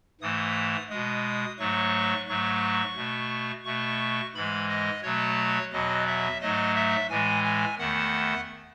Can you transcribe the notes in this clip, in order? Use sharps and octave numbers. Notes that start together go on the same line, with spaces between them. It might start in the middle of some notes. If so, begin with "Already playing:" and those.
G#2 E3 A3 D#6
B2 G#3 D#6
G#2 F#3 A3 C#6
G#2 F#3 A3 C#6
B2 A3
B2 A3 C#6
G#2 E3 G#3 B5
D#5
B2 F#3 A3 C#5
E2 B2 F#3 D#5
E5
G#2 F#3 A3 D#5
E5
A2 E3 G#3 G#5
G#5
E2 D#3 A3 F#5